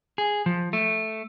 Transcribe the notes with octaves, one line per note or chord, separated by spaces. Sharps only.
G#4
F3
A3